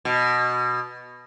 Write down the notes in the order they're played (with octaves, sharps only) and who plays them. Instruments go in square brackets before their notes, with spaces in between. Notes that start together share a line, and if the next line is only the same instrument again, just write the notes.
[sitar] B2